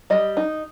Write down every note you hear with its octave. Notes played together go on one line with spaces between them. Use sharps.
G3 D#5
D#4